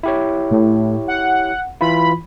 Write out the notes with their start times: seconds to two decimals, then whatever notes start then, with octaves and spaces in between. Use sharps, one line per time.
0.03 E4 G4 C#5
0.51 A2
1.08 F#5
1.81 E3 E4 F4 B5